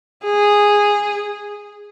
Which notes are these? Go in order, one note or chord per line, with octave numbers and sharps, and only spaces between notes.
G#4